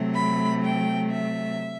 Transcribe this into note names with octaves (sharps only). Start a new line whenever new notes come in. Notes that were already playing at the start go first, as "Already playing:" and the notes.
Already playing: C3 F#3 A3
B5
G5
E5